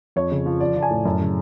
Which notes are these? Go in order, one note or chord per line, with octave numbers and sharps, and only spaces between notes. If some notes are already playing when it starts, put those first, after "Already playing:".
F2 C#5
C#3
F3
F3 D5
F3 A5
G#5
A2
F#2 A5
C#3